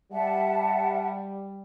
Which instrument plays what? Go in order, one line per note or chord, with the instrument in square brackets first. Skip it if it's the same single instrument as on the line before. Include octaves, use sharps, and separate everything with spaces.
[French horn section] G3 [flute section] E5 F#5 A5